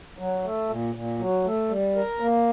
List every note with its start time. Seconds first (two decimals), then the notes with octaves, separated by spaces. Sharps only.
0.19 F#3
0.44 A3
0.70 A#2
0.95 A#2
1.19 F#3
1.45 A3
1.70 G3
1.96 A#4
2.20 A#3